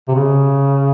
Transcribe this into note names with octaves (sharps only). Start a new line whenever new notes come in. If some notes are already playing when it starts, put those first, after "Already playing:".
C3
C#3